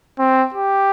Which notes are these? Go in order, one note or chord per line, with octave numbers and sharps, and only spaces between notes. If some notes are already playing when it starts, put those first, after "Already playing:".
C4
G4